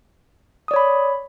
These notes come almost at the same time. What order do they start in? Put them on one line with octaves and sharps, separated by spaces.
D#6 D5 C#5 B5